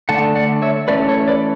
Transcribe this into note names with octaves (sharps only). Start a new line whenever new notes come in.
D3 A3 D4 F#5 A5
D5 F#5
C#5 E5
E3 A3 C#4 B4 D5
A4 C#5
B4 D5